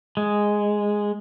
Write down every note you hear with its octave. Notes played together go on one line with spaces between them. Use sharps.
G#3